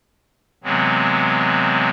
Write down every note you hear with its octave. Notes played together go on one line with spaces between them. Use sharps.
C3 E3 F#3 G#3 B3 C4